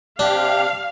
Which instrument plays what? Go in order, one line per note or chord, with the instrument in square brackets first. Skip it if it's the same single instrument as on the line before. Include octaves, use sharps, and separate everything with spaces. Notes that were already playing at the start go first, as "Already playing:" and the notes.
[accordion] C3 G4 [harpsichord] D4 [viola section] F5